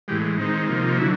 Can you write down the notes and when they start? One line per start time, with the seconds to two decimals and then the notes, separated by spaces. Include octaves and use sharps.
0.08 A2 E3 G#3 G4
0.38 D#3 G#3 C4 D#4
0.68 C3 F3 A#3 D#4
0.98 D3 F#3 E4